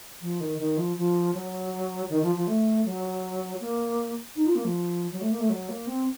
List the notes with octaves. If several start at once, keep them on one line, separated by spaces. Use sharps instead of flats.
F3
D#3
D#3
F3
F3
F#3
D#3
F3
F3
A3
F#3
A#3
D#4
F4
A#3
F3
F#3
A3
A#3
A3
F#3
A#3
C4